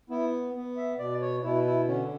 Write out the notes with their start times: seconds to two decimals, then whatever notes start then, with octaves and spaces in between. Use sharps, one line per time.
0.10 B3 E4
0.54 B3
0.77 E5
0.98 B2 D5
1.21 C#5
1.43 B2 E4
1.66 E4
1.88 D3 C#4